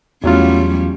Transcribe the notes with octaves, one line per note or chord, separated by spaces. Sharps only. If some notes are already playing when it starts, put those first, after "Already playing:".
E2 F#3 G3 A3 C#4 F4